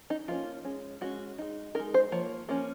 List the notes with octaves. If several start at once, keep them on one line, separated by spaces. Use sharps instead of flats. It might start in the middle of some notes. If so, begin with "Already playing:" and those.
D#4
F3 A#3 C#4 F4
G#3 C#4
G#3 C#4 F#4
G#3 D#4
G#3 D#4 A#4
C5
F3 A#3 C#5
F3 A#3 C#4